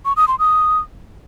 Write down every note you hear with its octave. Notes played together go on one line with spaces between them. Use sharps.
C#6
D#6
C6
D#6